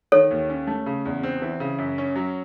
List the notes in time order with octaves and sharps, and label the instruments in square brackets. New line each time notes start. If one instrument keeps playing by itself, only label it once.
[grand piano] D#3 [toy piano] A4 C#5
[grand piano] D#2
C#4
A3
C#3
E2
C4
E3
C#3
F#2
C#4
F#3